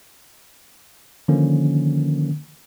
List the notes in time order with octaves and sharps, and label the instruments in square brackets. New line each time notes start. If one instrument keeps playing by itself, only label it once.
[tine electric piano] D3 D#3 F3 A#3 C#4